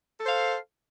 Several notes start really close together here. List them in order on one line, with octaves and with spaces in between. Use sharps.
A4 C5 F5